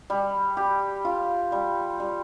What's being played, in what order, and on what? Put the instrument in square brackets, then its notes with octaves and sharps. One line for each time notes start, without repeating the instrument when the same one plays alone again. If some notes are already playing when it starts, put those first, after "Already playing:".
[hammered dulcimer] G3
G4
F4
G3
G3